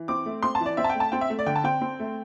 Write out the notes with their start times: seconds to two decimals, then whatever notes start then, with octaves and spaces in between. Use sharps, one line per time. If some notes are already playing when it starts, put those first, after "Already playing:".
Already playing: E3
0.08 C4 D6
0.26 A3
0.43 C4 C6
0.55 A5
0.60 E3
0.66 D5
0.77 C4 E5
0.84 A5
0.90 G5
0.95 A3
1.00 A5
1.12 C4 G5
1.21 E5
1.30 A3
1.39 D5
1.46 D3 G5
1.56 A5
1.64 C4 G5
1.82 C4
2.00 A3